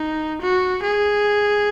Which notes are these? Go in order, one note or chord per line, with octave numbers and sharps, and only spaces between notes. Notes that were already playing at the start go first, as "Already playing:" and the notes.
Already playing: D#4
F#4
G#4